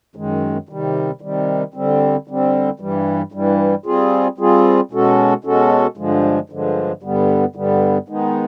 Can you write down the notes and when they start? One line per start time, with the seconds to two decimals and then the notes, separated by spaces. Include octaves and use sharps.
0.15 F#2 D#3 G#3
0.69 C3 D#3 G3
1.21 C3 D#3 G3
1.74 D3 G3 C4
2.28 D3 G3 C4
2.80 G2 E3 G3
3.32 G2 E3 G3
3.86 G3 C4 F4 G#4
4.38 G3 C4 F4 G#4
4.91 B2 G#3 C#4 F#4 A4
5.44 B2 G#3 C#4 F#4 A4
5.97 G2 D3 F3 G#3
6.50 G2 D3 F3 G#3
7.02 G2 D3 G3 B3
7.55 G2 D3 G3 B3
8.08 D#3 G#3 B3 D#4